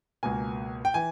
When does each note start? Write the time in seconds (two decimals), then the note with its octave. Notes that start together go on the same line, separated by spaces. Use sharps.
0.23 C#2 B2 A#3 G#5
0.85 G5
0.94 E3 G#5